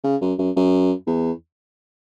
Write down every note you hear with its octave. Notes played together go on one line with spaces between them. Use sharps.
C#3
F#2
F#2
F#2
E2